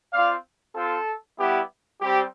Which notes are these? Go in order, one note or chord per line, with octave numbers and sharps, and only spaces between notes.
C4 F4 D5 F5
C4 F4 A4
G3 B3 E4 G4
G3 C4 G4